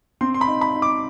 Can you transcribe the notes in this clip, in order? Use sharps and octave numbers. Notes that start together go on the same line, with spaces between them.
C4 C6
C6
B5
D#4
B5
D#4
D6